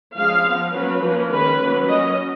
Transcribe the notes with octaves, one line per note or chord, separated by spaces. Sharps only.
F3 G#3 C#4 F5
F3 B3
F#3 A#3 C#4 B4
F3 A#3 C#4
D#3 G#3 C#4 B4
F#3 A#3 C#4
F#3 C#4 D#5